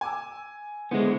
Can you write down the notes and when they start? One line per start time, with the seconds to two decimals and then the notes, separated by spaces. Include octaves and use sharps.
0.01 G#5 D6 E6
0.91 D3 G#3 B3 E4 C5